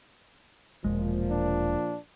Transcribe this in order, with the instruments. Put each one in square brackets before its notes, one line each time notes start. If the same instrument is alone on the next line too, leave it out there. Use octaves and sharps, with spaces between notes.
[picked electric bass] E1 E2 G#3 [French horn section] A#2 F3
[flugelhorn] D4